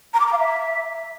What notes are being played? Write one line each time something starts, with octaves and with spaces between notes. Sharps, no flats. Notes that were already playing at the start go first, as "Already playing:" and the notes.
A#5
D6
A#5
F5
E5